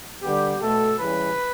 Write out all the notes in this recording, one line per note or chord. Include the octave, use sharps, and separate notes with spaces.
D3 G3 B3 G4
B2 A3 A4
C#3 E3 G3 B4